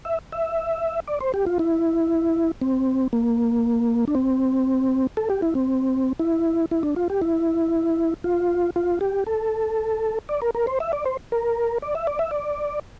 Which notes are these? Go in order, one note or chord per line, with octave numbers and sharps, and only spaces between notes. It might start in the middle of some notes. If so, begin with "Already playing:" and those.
E5
E5
D5
C5
G4
F4
E4
C4
A#3
D4
C4
A4
G4
E4
C4
E4
E4
D4
F4
G4
E4
F4
F4
G4
A4
D5
A#4
A#4
C5
E5
D5
C5
A#4
D5
E5
D5
E5
D5